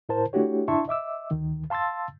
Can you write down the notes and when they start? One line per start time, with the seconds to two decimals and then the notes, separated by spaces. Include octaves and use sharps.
0.09 A2 E4 A#4 C5 A5
0.33 A3 D4 E4 F#4 G4 C#5
0.68 D4 E4 E5 A5 C6 C#6
0.88 D#5 E5 D6 E6
1.31 D2 D#3
1.70 F5 A5 C6 E6 A6